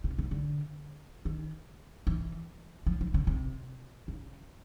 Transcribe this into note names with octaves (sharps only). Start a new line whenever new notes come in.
C3
C#3
D3
D#3
E3
F3
F3
C#3
C3
C#3